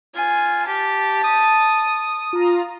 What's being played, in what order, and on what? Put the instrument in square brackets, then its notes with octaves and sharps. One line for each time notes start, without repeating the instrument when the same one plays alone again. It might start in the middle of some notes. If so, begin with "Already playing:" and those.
[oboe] F4 [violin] G#5
[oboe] G4 [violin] A5
[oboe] D#6
[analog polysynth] F4 A#5